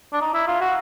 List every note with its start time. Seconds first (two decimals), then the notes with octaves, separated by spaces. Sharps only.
0.13 D4
0.21 D#4
0.34 E4
0.48 F4
0.61 F#4